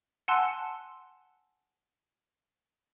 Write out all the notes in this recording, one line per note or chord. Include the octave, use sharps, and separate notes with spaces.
F#5 G#5 A5 C6 E6 F#6